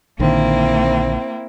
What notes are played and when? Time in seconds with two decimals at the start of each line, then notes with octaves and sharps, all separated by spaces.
0.19 A#1 D3 D#3 A#3 C4 E4